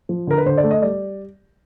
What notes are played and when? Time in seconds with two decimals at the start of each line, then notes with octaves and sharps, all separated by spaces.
0.09 F3
0.27 D3 A#4
0.38 B4
0.46 D3 C5
0.57 D5
0.64 A3
0.71 D#5
0.82 G3 D5